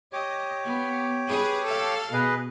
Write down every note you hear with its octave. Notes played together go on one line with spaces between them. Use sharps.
G4 C#5 D#5 D6
B3
G#4 B4
A4 F5
B2 G#4 B4 D#5